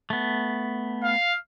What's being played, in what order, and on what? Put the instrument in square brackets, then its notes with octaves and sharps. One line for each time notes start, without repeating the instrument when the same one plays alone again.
[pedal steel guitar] A3 B3
[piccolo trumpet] F5